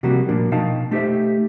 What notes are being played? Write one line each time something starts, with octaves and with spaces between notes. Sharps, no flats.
C3 F3 G3 A#3 F#4
A#2 F3 A#3 D4
B2 D#4 F5 G5 A5
A3 D#4 G4 A4 C5 E5